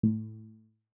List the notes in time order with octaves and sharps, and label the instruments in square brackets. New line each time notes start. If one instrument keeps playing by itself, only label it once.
[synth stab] A2